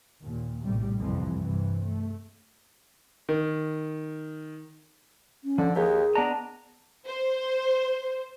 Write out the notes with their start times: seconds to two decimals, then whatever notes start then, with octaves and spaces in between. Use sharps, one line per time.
0.22 D#2 A#2
0.64 A#1 A2 C3 G3
0.97 C2 F2 E3
1.41 G2 C3 E3
1.85 A3
3.29 D#3
5.44 C#4
5.58 D3 F3
5.76 D#2 G4 G#4
6.15 B3 D4 D#5 A#5
7.07 C5